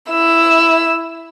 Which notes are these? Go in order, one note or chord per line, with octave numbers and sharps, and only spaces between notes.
E4 E6